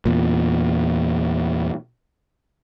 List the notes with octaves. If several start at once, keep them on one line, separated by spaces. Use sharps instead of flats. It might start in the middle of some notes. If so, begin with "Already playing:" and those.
E2 A#2